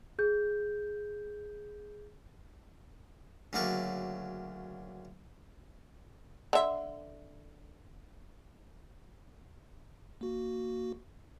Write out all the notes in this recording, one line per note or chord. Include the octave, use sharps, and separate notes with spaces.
G#4 G6
D2 C#3 F#3 A#3 D5 C#6
D3 E5
A#3 F#4